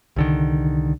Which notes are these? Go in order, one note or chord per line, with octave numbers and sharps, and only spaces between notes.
C2 D3 D#3